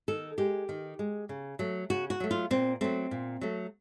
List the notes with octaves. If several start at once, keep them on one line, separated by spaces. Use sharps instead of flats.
D#3 A4
G#3 G4
D#3
G#3
C#3
F#3 A3
C#3 F#4
F#4
F#3 A3
F4
A#2 C4
F#3 A3 C4
A#2
F#3 A3